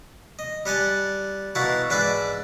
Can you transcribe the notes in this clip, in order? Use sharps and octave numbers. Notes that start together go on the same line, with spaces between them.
D#5
G3 F#5 G#5 A5
B2 A#3 E4 F#4 A5
G#2 D4 B4 D5 E5